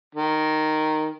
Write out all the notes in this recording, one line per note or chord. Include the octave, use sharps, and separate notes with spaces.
D#3